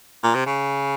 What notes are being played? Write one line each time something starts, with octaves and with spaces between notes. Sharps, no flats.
A#2
C3
C#3